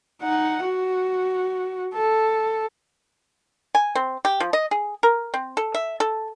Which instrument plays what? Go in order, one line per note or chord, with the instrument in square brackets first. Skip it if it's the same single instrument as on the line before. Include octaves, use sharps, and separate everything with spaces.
[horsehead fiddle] D#4 F#5
F#4
A4
[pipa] G#5
C4
G4
F3
D#5
G#4
A#4
C4
A4
E5
A4